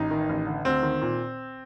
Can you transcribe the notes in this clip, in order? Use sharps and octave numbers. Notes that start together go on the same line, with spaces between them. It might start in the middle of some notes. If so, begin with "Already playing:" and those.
Already playing: A1 D#4
D#3
A1
D3
D2 C4
D#3
A#2